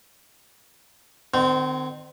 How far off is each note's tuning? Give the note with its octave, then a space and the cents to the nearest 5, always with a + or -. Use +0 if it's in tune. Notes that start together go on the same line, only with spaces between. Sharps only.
D#3 -45 C4 -25